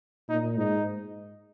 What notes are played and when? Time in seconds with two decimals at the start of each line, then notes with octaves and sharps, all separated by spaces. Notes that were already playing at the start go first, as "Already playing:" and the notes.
0.29 A#2 D#4
0.58 G#2 D#4